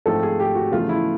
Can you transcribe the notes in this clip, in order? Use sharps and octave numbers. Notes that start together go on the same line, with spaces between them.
G#2 F3 A3 C4 A4
G#4
G4
F#4
E2 C#3 F3 A3 F4
E4